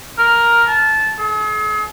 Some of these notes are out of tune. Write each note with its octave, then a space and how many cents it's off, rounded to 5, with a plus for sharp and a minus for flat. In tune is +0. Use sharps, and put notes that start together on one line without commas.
A#4 +5
A5 -15
G#4 +45